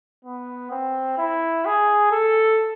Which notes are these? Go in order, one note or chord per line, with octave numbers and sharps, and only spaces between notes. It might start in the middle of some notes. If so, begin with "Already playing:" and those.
B3
C4
E4
G#4
A4